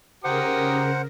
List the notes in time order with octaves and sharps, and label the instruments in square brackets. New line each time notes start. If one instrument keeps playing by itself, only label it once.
[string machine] C#3 A#4 [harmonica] G4 A#5 D#6 [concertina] C5 F#5